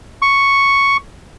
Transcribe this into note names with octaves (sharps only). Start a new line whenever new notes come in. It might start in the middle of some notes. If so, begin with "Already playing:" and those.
C#6